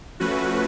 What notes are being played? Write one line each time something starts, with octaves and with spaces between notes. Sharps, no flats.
F3 A3 C#4 F#4 B4